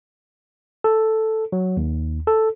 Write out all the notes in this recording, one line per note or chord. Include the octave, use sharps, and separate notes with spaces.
A4
F#3
D#2
A4